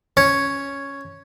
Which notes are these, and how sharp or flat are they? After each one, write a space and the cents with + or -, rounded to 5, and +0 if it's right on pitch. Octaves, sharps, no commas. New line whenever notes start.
C#4 +0 C#5 +0